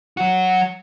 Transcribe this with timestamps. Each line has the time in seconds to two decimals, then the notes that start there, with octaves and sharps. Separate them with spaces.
0.17 F#3 F#4